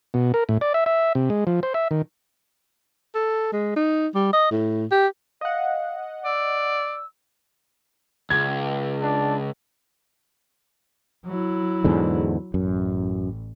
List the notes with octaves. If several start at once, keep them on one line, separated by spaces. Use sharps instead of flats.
B2
A#4
A2
D5
E5
E5
C3
G#3
F3
C5
E5
D#3
A4
G#3
D#4
G3
D#5
A2
G4
D#5 F5 F#5
D5 E6
C#2 G#6
D4
F#3 E4
E2 G#2 D3
A1 F#2